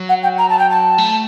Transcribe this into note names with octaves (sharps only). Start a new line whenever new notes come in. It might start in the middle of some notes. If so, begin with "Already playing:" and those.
Already playing: F#3
F#5
G5
A#5
A5
G5
A5
A3